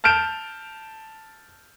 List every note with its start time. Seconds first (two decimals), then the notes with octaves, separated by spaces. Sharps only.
0.04 A5 F6 G6 D7 E7